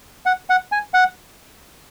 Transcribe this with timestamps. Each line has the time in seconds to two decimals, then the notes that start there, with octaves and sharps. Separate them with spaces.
0.26 F#5
0.50 F#5
0.72 G#5
0.94 F#5